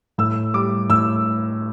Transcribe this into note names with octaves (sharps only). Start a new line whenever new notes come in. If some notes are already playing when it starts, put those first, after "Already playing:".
A2 E6
G3 D6
A2 E6